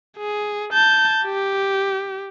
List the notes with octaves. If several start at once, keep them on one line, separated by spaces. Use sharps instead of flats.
G#4
A5 G6
G4